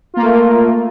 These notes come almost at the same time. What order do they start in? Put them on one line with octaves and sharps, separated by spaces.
F4 A#3 A#4 A3